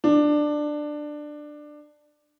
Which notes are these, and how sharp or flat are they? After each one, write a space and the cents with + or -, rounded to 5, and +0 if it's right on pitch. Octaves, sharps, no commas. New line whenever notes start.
D4 +15